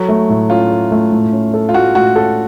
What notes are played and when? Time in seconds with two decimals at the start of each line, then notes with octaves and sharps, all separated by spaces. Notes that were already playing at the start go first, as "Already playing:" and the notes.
Already playing: F#3 A4
0.08 A3
0.29 A2
0.50 C#4 F4
0.71 A4
0.91 A3
1.12 A2
1.33 C#4
1.54 A4
1.69 F4
1.74 A3 F#4
1.95 A2 F#4
2.16 C#4 A4